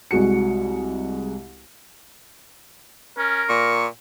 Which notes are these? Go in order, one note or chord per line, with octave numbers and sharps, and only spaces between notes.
C2 G#3 F#4 C#7
C#4 A#4
A#2 C#6